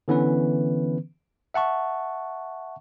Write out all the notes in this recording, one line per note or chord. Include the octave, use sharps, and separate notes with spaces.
D3 E3 B3 C#4 B4
E5 F#5 A5 C#6